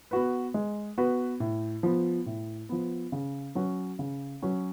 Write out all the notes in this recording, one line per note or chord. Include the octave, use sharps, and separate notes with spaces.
B3 F#4 B4
G#3
B3 F#4 B4
A2
F3 B3
A2
F3 B3
C#3
F#3 C#4 F#4
C#3
F#3 C#4 F#4